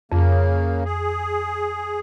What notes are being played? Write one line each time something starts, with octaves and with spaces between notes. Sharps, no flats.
F2 C#3 A#3
G#4